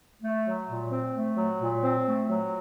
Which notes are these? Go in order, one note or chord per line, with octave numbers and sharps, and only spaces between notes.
A3
F#3
A#2
C4
A3
F#3
A#2
C4
A3
F#3